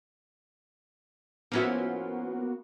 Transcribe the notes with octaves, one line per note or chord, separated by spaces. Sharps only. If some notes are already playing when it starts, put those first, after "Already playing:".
F3 A#3 B3 C#4 E4 F#4